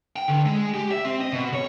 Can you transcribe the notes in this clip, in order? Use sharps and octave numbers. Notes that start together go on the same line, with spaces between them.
G5
D3
G#3
G4
E5
C4
D#5
B2
C#5